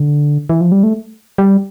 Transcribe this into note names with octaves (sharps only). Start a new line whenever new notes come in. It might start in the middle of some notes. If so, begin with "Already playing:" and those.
Already playing: D3
E3
F3
G3
A3
G3